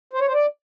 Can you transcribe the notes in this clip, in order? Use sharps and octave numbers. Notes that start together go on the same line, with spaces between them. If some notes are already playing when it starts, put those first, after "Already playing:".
C5
C#5
C5
D5